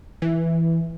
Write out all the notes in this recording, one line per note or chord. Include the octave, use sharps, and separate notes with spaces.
E3